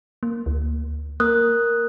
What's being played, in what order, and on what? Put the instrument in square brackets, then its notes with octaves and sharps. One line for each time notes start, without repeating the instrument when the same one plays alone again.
[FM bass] A#3
D2
[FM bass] A#3 [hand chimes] A#4 D#6 F#6